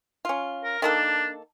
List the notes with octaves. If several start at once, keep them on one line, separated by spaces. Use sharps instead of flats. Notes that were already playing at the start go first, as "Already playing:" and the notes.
C#4 F4
A#4
D#3 A#3 D4 A4